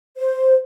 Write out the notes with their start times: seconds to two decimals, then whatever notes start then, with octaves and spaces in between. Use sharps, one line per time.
0.17 C5